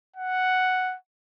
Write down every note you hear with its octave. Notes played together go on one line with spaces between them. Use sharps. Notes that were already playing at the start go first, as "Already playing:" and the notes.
F#5